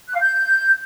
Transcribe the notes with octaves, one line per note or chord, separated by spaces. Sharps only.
F#6
F5
G6